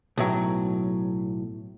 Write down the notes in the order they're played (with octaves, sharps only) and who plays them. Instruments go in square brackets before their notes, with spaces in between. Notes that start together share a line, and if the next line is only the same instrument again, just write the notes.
[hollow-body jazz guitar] B1 A2 F#3